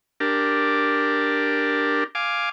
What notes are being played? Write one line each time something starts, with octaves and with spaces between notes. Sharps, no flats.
D4 G4 A#4
F5 G#5 D6